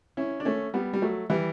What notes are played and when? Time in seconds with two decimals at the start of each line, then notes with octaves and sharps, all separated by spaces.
0.17 C#4 E4
0.40 D4
0.45 A3 C#4
0.74 G3 B3
0.93 G3
1.02 F#3 A3
1.30 E3 G3